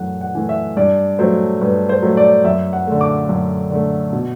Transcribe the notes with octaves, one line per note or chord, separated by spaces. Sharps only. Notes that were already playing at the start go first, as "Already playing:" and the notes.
Already playing: F#2 E3 A3 F#5
F#5
E3 A3
E5
G2 D5
F#3 A3 C5
G2 B4
C5
F#3 A3
D5
F#2 E5
F#5
D3 A3
D6
F#2
D3 A3
B2